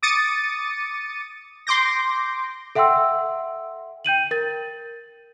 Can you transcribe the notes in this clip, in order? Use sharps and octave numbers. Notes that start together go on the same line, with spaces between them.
D6 D#6 A6 C#7 D#7
C6 D6 G6 A#6
A4 E5 F#5 G5 C6 E6
G5 G6 D#7 F#7
A#4 A6